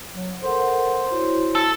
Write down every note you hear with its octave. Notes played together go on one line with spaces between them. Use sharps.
F#3
A4 A#4 C5 F#5
E4 F#4 C#5
A4